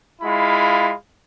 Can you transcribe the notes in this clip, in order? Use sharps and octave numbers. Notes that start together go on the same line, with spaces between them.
G#3 E4 F4 F5 B5